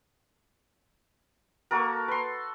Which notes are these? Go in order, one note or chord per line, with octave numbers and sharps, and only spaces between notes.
A#3 F#4 A4 A#4
B4 C6